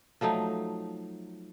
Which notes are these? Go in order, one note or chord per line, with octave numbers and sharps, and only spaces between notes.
F3 F#3 A3 D#4